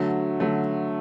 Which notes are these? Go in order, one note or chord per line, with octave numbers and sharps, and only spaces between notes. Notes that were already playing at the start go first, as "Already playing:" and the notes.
Already playing: D3 F#3 A3
D3 F#3 A3